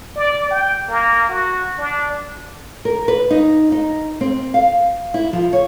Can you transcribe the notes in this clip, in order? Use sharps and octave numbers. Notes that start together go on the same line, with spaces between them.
D5
G5
A#3
F#4
D4
A#4
B4
D#4
D#4
C4
F5
E4
F3
C#5